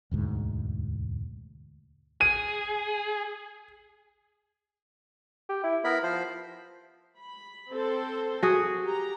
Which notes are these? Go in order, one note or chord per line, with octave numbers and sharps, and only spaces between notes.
E1 D2 G#2
G#4 D#7
G4
E4
B3 E4 A#4 B5
F3 C5
B5
C4 A4 C5
F#4 G#4
G4 A#5